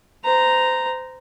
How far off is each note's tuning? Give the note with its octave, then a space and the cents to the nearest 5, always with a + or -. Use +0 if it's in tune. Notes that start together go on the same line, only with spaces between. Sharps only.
C5 -25 A#5 +0